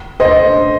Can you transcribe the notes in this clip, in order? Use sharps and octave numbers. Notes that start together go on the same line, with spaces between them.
C5 D#5